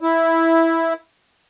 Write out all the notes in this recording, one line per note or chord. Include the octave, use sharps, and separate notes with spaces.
E4